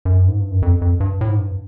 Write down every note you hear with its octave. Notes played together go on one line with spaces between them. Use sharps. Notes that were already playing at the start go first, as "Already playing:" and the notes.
F#2
G#2
G2
F#2
F2
F2
G2
A2
G#2
G2